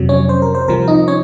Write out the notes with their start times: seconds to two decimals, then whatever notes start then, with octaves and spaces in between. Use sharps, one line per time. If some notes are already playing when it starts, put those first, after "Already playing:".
Already playing: F2 C3 F#3
0.09 C#4 C#5
0.29 C5
0.42 A#4
0.55 C5
0.68 C2 C3 F3 C4 A#4
0.88 D#4 D#5
1.08 C#4 C#5